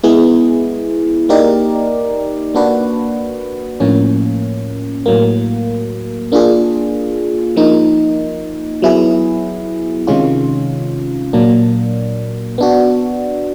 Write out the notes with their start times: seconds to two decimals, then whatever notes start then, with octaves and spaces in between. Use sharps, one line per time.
0.03 G#3 B3 E4 G#4
1.29 A#3 D#4 G4 A#4 D5
2.54 A#3 D4 F#4 B4
3.80 A2 F3 A#3 C#4
5.06 A2 F#3 A#3
6.32 A#3 D4 F4 G#4
7.56 F3 A#3 D#4
8.82 F#3 B3 E4 G#4
10.07 C3 D#3 G#3 C#4 F4
11.33 A#2 F#3 A#3 D4
12.58 B3 D4 F#4